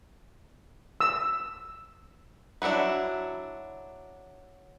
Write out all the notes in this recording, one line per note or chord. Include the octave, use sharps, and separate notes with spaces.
E6
F#3 D4 E4 F#4 B4